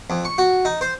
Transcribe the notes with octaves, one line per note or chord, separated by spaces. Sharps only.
F2
C#6
F#4
D#4
C5